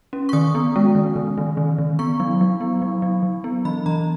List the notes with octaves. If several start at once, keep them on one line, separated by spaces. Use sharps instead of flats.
C#4
C#6
D#3 D#6
B3
G#3
D#3
D#3
D#3
D#3
D#3
B3 C#6
F#3
F#3
B3
F#3
F#3
F#3
B3
E3 B5
E3 A#5